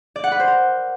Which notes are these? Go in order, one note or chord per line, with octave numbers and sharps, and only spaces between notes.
D5
F#5
B4
C5
A#4